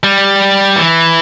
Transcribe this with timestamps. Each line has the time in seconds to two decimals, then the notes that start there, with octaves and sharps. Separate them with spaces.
0.03 G3
0.76 E3